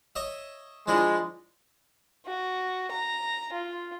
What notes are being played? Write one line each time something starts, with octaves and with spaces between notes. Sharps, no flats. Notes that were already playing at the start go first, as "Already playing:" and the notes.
C#5 D#5 E5
F3 G#3 D4 E4
F#4
A#5
F4